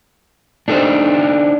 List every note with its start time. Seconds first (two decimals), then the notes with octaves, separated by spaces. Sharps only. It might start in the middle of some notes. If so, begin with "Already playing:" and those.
0.68 D4 D#4 A4 A#4 C5 D5